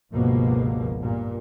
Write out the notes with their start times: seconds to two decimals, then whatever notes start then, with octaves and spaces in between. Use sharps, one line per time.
0.13 G1 C#2 G2 B2 F3 A#3
1.00 G2 A#2